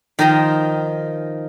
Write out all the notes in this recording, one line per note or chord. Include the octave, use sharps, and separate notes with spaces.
D#3 F3 D#4 D#5 A#5 C6